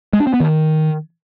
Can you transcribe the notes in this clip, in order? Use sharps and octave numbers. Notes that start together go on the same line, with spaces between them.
G#3
D4
C4
B3
D#3